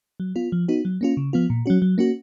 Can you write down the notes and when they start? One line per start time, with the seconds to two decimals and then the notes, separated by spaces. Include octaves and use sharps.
0.20 F#3
0.36 B3 F4
0.52 F3
0.68 B3 D#4 F#4
0.85 F#3
1.01 A#3 C#4 F4
1.17 C#3
1.33 F3 B3 F4
1.50 A#2
1.66 F#3 C#4 F#4
1.82 F#3
1.98 A#3 C#4 F#4